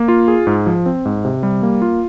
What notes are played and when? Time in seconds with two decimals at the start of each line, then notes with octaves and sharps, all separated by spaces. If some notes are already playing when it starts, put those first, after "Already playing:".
Already playing: A#3
0.08 F4
0.28 G#4
0.47 G#2
0.66 F3
0.86 C4
1.05 G#2
1.25 C3
1.43 G3
1.63 A#3
1.82 F4